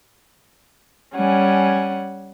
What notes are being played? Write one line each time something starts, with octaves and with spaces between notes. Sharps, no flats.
G3 C#4 F#5 G#5